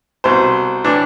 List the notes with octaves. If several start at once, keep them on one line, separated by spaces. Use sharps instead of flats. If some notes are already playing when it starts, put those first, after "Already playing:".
C2 B2 C5
A2 E3 D4